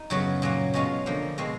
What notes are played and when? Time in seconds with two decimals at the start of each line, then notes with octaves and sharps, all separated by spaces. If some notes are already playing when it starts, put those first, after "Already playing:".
Already playing: D#4
0.10 F#2 C#3 F#3 B3
0.42 A#2 F#3 A#3
0.74 B2 G#3 C#4 F4
1.06 D3 F3 A#3
1.38 B2 G#3 C4